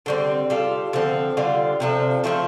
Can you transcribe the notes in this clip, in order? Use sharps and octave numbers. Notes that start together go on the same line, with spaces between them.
D3 G3 C4
G3 F4 A4
D3 F3 C4 A4
D3 G3 F4
C3 F3 D4 A4
F3 A3 C4 A4